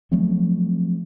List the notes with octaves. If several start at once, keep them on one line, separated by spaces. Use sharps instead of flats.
F3 F#3 A3 C4